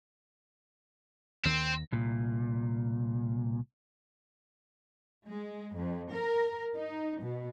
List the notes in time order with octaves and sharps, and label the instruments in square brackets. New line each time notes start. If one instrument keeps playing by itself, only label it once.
[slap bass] D#2 D#3 [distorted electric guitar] C4
[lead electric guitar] C2 A#2
[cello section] G#3
F2
A#4
D#4
B2